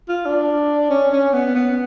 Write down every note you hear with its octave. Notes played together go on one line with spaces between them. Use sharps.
F4
D4
C#4
C#4
B3
B3